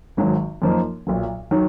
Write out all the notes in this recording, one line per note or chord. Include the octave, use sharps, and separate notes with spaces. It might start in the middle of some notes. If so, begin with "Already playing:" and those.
G#1 G#2 F#3
F#2 F3 A#3 D#4
B1 A#2 F#3
D#3 F#3